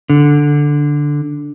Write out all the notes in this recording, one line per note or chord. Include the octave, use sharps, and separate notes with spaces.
D3